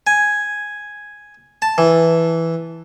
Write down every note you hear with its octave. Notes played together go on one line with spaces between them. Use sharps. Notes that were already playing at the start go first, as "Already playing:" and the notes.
G#5
A5
E3